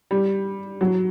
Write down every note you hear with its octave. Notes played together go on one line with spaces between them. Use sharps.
G3
F#3